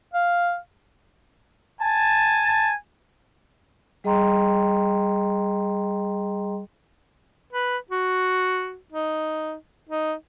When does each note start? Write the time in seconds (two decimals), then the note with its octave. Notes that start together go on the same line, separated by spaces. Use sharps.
0.14 F5
1.81 G#5 A5
4.04 G3 G#4 D#5 G5 A#5 C6
7.53 B4
7.91 F#4
8.92 D#4
9.89 D#4